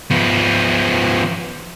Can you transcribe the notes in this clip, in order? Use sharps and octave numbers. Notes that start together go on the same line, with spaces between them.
F3 B3